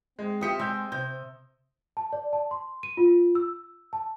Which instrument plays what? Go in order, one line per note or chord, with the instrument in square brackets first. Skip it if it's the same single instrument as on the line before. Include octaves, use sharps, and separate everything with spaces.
[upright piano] G#3 [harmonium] C4
[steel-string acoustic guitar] F4 G4 E5 [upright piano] D#6 C#7
[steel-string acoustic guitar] G#3 [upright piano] C6 E6 G6
[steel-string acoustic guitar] C3 [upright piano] G6
[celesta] A5
D5
A5
C6
D#7
F4
E6
A5